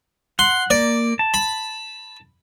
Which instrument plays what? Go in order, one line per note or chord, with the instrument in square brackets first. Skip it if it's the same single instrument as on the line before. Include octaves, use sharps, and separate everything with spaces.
[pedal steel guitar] F#5 [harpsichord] C6
[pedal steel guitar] A#3 [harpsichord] D5
[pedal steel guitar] A5
[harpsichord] B5